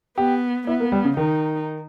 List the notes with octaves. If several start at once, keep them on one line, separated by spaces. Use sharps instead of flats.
B3 G4
B3 E4
A#3
G3
C#3
D#3 D#4